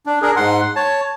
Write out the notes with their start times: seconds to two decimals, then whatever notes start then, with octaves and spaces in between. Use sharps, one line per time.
0.06 D4
0.22 D4 G#4 A#4
0.36 G#2 F#5 C6
0.76 C#5 A5